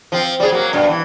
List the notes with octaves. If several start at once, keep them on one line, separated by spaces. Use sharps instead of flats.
F3 C4
G3 G#4
F#3 A#3
G2 B2
E3